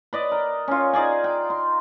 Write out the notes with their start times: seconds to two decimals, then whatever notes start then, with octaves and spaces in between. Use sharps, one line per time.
0.13 B4 D5 D#5
0.32 A#4
0.68 C#4 F4
0.94 D#4 G#4 D5 G#5
1.24 G5
1.50 C6